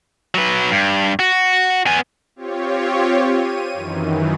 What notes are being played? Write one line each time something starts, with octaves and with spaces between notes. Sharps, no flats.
F#3 B4
G2
F#4
B3 G#5
C4 F4 G4 C#5
D#7
F#2 D#3 E3